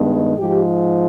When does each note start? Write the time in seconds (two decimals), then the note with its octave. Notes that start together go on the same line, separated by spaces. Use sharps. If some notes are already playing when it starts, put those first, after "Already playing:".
Already playing: G2 D#3 G#3 B3
0.38 G#2 F3 G#3 G4